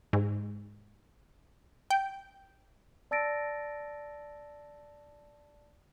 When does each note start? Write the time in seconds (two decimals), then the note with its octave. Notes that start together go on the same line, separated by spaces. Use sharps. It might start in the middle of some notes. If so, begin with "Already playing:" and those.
0.13 G#2
1.90 G5
3.11 D5 A5 E6 A6 A#6 D7